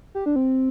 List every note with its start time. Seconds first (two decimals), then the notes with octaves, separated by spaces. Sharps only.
0.15 G4
0.26 D4
0.36 C4